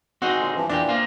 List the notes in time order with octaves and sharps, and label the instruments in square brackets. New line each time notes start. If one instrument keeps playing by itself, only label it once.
[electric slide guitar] C4 D#4 G#4 [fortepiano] F#4
[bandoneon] A#2 D3 G#3
G2 E3 F3
[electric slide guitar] E2 D#4 G4 [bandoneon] A#2 E3 [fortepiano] D4
[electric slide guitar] A#3 C4 F4